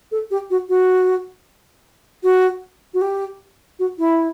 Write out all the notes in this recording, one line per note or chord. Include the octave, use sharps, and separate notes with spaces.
A4
G4
F#4
F#4
F#4
F#4
G4
F#4
E4